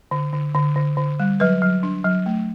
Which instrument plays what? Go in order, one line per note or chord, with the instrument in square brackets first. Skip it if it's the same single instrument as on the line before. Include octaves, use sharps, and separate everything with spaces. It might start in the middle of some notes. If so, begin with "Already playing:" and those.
[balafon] D3
D3
D3
D3
D3
G3
F#3 B4
F#3
D4
F#3
A3